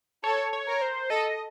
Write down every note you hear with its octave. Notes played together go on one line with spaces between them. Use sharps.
A4 C#5
C#5
A#4
C5
A4 D#5